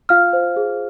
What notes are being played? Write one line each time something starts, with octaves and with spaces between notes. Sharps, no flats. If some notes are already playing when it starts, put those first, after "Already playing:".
F4 F5 F6
C5
G#4